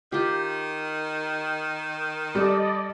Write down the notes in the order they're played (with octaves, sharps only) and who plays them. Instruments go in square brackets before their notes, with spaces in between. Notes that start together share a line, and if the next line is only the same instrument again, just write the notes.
[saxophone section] D#3 [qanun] F4 G4
[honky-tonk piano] G3 [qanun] A4 [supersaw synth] D5 D#5